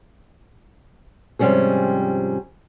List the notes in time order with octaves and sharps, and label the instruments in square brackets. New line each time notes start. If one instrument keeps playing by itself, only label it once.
[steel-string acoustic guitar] G#2 C3 F3 G3 C#4 G#4